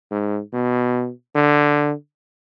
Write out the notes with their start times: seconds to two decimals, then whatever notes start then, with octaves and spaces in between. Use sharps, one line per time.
0.11 G#2
0.53 B2
1.35 D3